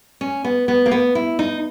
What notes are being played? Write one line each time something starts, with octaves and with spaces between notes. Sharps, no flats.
C#4
B3
B3
A#3
B3
E4
D#4